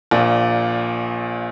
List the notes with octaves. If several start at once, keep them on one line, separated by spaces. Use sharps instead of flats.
A#1 A#2